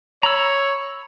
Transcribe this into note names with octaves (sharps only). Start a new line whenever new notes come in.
C#5 A#5 B5 E6